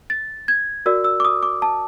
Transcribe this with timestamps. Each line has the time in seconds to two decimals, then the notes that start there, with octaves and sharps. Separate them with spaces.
0.10 A6
0.48 G#6
0.86 F#4 A#4 D5 E6
1.04 E6
1.20 D6
1.25 D#6
1.43 D6
1.62 A5